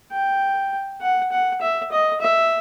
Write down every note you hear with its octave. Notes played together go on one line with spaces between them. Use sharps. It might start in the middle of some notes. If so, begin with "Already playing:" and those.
G5
F#5
F#5
E5
D#5
E5